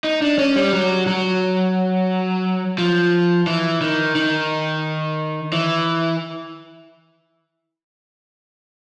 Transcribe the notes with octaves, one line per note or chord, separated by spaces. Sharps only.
D#4
D4
C#4
G3
F#3
F#3
F3
E3
D#3
D#3
E3